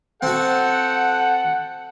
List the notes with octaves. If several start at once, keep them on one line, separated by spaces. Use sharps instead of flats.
C4 F#4 A4 F#5 G5